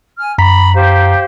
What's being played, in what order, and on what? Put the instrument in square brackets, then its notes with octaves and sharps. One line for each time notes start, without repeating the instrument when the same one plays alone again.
[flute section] G#5 F6
[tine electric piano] F#2 A#5 B6 [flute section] B5
[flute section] G4 C5 F5